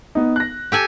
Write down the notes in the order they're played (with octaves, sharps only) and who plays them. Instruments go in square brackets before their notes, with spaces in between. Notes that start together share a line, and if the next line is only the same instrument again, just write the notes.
[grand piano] B3 D#4
F#6 A#6
[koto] G4 A4 G#5